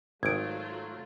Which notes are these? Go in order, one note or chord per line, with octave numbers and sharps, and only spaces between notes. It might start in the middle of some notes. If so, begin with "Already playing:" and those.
G#1 F#3 A3 F4 G#6 D7